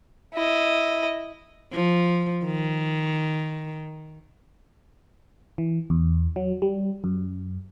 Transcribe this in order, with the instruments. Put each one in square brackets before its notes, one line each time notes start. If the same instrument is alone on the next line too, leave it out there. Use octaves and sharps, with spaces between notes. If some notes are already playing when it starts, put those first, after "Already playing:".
[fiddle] E4 D#5
[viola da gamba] F3
D#3
[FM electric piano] E3
E2
F#3
G3
F#2